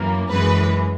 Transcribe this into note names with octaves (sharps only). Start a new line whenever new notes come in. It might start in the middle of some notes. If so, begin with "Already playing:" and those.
Already playing: F#2 E3 A#3
F#2 E3 G#3 B4